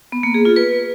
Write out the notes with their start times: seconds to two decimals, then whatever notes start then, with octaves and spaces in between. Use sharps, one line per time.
0.12 B3
0.23 A#3
0.34 G#4
0.45 F4
0.56 B4